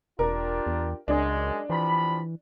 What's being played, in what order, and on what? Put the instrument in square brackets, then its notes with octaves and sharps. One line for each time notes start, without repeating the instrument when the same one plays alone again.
[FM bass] E1 [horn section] D4 F4 G4 [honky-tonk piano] A#4
[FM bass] E2
[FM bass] C#2 [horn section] F#2 G#3 [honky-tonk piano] D4
[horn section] C3 F3 B5 [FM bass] E3